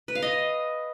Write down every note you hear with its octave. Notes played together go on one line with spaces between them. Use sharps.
B4
F5
D#5